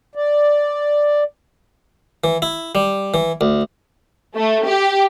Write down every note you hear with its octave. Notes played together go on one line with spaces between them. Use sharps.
D5
E3
E4
G3
E3
D2
A3
G4